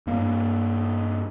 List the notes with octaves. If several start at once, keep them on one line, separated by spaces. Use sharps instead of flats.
G2 A#3